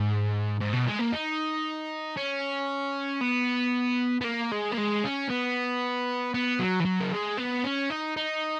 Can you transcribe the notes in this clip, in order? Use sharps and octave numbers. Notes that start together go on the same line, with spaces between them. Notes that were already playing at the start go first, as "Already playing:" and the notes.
Already playing: G#2
G#2
B2
G#3
A#3
D#4
C#4
B3
B3
A#3
G#3
A#3
G#3
C#4
B3
B3
F#3
E3
F#3
A#3
G#3
B3
C#4
D#4
D#4